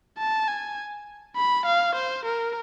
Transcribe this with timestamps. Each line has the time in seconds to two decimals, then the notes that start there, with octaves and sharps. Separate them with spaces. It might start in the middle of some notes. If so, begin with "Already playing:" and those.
0.18 A5
0.48 G#5
1.36 B5
1.66 F5
1.95 C5
2.25 A#4